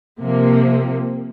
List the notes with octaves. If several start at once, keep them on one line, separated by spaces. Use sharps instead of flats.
C3 F3 A#3